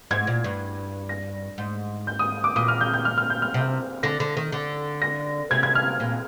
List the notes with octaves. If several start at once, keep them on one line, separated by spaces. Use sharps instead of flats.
G#2 G#6
A#2
G2
A#6
G#2
G6
D#6
D6
A#2 D#6
F6
G6
G6
F6
F6
G6
F6
C3
D3 A#6
D3
D#3
D3
A#6
C3 G#6
G#6
F6
A#2